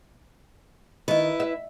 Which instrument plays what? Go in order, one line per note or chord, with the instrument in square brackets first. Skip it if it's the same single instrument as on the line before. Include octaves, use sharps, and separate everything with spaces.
[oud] D#3 [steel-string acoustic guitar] E4 B4
[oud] E5